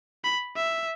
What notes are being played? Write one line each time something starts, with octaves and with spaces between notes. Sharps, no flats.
B5
E5